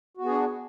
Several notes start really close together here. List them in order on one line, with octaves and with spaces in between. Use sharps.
F#4 B3 G#4 D4